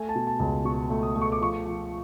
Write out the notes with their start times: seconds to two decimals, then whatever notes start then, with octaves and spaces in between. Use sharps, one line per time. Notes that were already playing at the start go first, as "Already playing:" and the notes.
Already playing: A3 G#5
0.09 A5
0.15 B2
0.27 A5
0.40 C#2
0.65 B2 C#6
0.90 A3
1.03 D#6
1.16 A3
1.21 C#6
1.32 D6
1.41 F3 C#6
1.66 F3